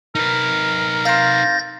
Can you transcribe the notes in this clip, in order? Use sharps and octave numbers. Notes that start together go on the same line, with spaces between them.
D#4 A#4 B4
C4 F5 G6 A6 A#6